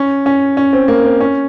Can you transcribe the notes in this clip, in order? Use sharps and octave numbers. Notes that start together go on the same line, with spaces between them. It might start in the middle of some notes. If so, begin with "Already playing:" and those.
Already playing: C#4
C#4
C#4
C4
A#3
C4
C#4